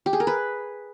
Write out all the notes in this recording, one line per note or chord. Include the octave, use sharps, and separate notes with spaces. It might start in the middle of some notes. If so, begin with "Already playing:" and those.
G4
G#4
A#4
B4